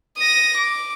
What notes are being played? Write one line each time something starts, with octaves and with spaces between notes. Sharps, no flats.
D#6 A#6
D6